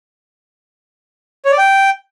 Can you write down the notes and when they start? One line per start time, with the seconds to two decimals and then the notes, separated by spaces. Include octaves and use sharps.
1.45 C#5
1.52 D5
1.58 G5